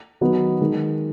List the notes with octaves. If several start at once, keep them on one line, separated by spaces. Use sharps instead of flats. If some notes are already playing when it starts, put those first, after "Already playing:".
D#3 F#3 B3 D#4 F#4
D#3 G#3